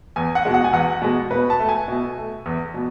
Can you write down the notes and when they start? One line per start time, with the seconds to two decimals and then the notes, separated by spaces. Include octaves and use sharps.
0.16 E2 G#5
0.35 F#5
0.45 B2 G#3
0.54 F#5
0.64 G#5
0.73 E2 F#5
1.02 B2 G#3
1.31 B2 B4
1.50 A5
1.59 A3
1.69 G#5
1.88 B2
2.18 A3
2.46 E2
2.74 B2